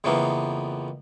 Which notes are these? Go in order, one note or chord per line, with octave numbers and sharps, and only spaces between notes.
F2 C#3 E3 F3 A#3 B3